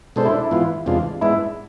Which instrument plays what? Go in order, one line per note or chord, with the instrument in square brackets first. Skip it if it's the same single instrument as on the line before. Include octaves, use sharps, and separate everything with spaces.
[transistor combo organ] B2 G#3 D4 A4 C5
[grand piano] E4
D4
E4
[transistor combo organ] G#2 E3 B3 F4
E2 C3 G#3 D4 F4
[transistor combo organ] G#2 G#3 B3 D4 [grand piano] E4